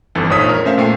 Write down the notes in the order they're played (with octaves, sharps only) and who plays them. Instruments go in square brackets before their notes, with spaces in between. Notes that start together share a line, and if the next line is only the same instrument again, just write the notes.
[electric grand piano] G1 F2 E3 A4 A6
A#1 G#2 F3 C#5 D#6 B6
A#4
A3 C#4 C5 E5 F5
A#2 A3 G5 C7